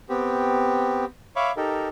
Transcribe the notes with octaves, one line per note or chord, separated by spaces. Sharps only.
B3 C4 G4
C#5 E5 F5 B5 C#6 D6
D#4 G4 A4 A#4